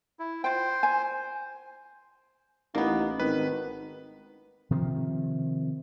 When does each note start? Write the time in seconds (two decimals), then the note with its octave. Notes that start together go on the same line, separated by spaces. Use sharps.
0.19 E4
0.44 F4 C5 G5
0.83 G#5
2.75 A1 A#3 B3 D#4
3.20 G#1 D#3 B4
4.71 C3 D#3 F3